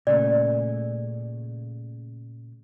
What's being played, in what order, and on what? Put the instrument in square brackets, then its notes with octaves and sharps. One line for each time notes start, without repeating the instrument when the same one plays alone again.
[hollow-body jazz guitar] A#2 C#3 A3 [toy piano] D5